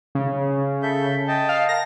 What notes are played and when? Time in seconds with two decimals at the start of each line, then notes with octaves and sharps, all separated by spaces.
0.15 C#3
0.83 A4 E5 G6
1.28 D#5 G5 A5
1.49 F5
1.69 A#4 A#6